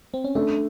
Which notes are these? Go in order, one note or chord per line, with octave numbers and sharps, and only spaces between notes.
C4
C#4
A3 D4